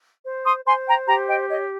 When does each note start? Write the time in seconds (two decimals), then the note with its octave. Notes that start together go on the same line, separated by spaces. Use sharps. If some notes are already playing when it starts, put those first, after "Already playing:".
0.24 C5
0.45 C6 D#6
0.66 C5 G#5 C6
0.86 G5 A#5
1.06 G4 G5 A#5
1.27 D#5 G5
1.48 C#5 D#5